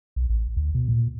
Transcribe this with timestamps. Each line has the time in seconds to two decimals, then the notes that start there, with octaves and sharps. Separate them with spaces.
0.16 B1
0.30 A1
0.57 D2
0.75 B2
0.89 A#2